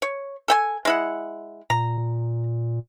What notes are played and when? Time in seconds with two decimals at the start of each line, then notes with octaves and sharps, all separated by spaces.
0.02 C#5
0.48 A4 G5 G#5
0.85 G#3 E4 F#5
1.70 A#2 A#5
1.97 A#2